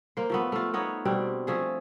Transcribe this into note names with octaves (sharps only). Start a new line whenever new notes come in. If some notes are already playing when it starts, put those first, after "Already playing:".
A#3 C5
F3 A3 B3
A3 F4
B3 D#4 C#5
B2 G3 C4 D4
F3 A3 G#4